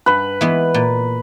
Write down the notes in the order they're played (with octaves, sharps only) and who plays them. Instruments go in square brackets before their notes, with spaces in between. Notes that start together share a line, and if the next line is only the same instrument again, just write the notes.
[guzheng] G2 [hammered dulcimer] B4
[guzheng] E3 G#3 B3
A#2